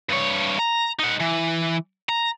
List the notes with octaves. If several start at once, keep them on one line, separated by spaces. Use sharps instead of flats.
G2 C#5
A#5
D#4 F#5
E3
A#5